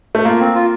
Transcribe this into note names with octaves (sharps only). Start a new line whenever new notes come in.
A3
A#3 F4
C4
F4